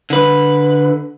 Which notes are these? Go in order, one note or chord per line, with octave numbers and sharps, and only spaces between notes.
D3 B4